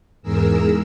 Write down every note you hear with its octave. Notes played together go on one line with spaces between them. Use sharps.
E2 G#2 G#4 A#4 E6